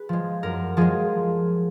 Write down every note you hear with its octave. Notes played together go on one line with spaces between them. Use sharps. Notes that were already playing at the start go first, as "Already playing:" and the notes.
Already playing: G#4 B4
F3 G#3
F#2 A#4
F3 G#3 G#4